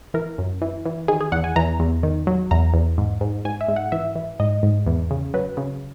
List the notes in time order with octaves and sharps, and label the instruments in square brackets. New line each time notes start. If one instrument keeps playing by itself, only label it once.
[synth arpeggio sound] E3 A#4
F#2
E3
E3
D#3 G#4
G#4
E2 F#5
G#5
E2 A#5
E2
D#3
F#3
E2 A#5
E2
G#2
G#2
G#2 G#5
E5
G#2
F#5
E3 E5
E3
G#2 D#5
G#2
E2
C#3
F#3 B4
C#3